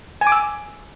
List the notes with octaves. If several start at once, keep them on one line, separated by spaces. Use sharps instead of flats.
G#5
D6
E6